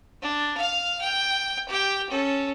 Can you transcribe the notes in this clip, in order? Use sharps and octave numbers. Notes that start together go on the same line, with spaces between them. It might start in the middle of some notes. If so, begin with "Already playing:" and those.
D4
F5 F6
G5
G4 G5
C#4 A4